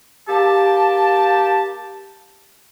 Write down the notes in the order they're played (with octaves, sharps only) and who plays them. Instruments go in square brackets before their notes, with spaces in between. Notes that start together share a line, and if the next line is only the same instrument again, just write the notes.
[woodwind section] A#3 G4 A5